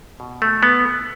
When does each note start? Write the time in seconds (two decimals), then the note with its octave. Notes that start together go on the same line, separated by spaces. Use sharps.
0.20 B2
0.42 A3
0.63 B3